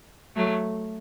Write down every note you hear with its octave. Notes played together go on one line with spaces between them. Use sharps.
F#3 A3